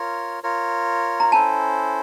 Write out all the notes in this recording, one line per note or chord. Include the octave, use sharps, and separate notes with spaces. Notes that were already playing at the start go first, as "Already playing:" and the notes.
Already playing: F4 A#4 C#5
F4 A#4 C#5
A#5
C#4 E4 A4 C5 A5